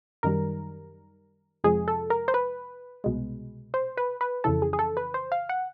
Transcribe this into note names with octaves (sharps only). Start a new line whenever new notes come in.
F#2 D#3 G3 A#4
F2 C3 F3 G#3 G#4
A4
A#4
C5
B4
C2 B2 G#3
C5
B4
B4
F2 C#3 E3 A4
G#4
G#4
A4
B4
C5
F5
F#5